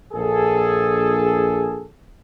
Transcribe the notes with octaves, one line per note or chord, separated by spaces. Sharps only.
A#1 G#4 A4